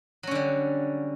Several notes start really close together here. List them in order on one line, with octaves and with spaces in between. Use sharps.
F#3 C#4 D3 G3